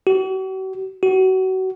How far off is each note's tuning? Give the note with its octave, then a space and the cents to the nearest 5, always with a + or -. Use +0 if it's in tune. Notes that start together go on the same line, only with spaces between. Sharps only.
F#4 +45
F#4 +30